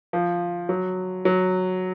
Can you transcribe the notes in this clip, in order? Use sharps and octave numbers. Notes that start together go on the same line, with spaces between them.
F3
F#3
F#3